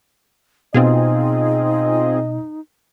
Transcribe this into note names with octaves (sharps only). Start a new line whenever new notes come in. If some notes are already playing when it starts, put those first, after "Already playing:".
B2 C4 D#4 F4 G#4 D#5